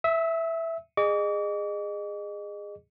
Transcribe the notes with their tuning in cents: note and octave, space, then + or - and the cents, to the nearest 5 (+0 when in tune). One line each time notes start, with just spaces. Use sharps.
E5 +0 E6 -40
G#4 -15 D#5 -30 D6 -45